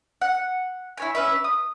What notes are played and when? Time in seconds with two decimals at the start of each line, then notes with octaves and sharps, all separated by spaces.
0.21 F#5
0.97 E4 C#5 G#5
1.15 C#4 B4 E5
1.44 D#6